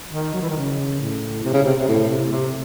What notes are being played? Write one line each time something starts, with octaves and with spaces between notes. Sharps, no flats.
D#3
F#3
E3
D#3
C#3
A2
C3
C#3
C3
C3
A2
C3
C3